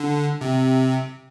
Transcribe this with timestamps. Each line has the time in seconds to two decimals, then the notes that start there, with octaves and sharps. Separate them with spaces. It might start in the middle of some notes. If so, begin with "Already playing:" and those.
Already playing: D3
0.41 C3